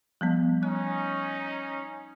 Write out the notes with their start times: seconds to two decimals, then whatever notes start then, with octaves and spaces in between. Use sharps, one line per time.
0.21 F3 G3 B3
0.63 C#4 D#4 F#6